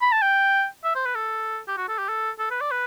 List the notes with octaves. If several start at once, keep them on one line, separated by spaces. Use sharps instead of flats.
B5
A5
G5
E5
C5
B4
A4
G4
F#4
A4
G4
A4
A4
B4
D5
B4